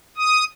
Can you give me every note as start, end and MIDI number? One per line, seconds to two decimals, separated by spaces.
0.17 0.44 87